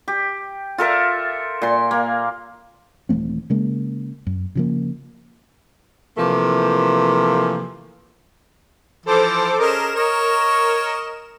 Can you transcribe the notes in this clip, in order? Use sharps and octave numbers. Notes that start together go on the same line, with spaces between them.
G4
F4 A4 A#4 E5
A#2 C6
A#3
D#1 E3 A3 C4
C#3 G#3 A#3
F#2
C#3 F3 A#3
C3 E3 F3 A3 A#3
E3 F3 A4 C5 D6
C#4 G#4 A#4 D#5 E7
C#5 D#5 C#6